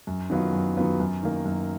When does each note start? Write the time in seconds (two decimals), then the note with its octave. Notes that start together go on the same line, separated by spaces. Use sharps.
0.07 F#2
0.30 D#3 F#3 B3 F4
0.53 F#2
0.76 D#3 F#3 B3 F4
1.00 F#2
1.23 D#3 A#3
1.45 F#2